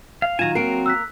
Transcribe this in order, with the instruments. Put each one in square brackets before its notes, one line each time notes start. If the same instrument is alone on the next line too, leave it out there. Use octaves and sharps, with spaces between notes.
[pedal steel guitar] F5
[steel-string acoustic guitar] D#3 F#3 F4 [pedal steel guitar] G#5 A#5 [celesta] E7
[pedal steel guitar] F#3 C4 F#4 [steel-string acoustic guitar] A#3 A#4 [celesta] C7 D7
[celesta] E6 F#6 B6